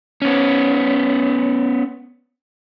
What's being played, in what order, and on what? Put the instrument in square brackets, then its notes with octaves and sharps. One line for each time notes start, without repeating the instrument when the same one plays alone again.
[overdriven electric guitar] B3 C#4